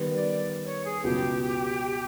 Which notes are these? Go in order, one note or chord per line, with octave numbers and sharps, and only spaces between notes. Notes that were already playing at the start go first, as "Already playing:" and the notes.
Already playing: D#3 G3 B3
D5
C#5
G#4
C#2 B2 F#3 G4